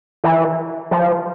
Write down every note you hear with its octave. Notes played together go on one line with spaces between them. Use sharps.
E3
F3